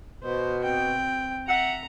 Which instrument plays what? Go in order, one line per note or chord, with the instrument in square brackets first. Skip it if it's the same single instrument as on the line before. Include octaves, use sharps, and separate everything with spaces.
[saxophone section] B2 [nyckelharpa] C5
[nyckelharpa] C4 G5
[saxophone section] E5 F#5 [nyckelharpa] A#5